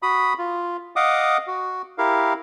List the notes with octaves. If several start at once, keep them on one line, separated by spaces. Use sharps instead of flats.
F#4 B5 D#6
F4
D#5 F5 F#5 D6 D#6
F#4
E4 G4 A#4 F5